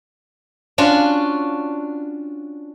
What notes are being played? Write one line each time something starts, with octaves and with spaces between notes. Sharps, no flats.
C#4 D4 F4 F#4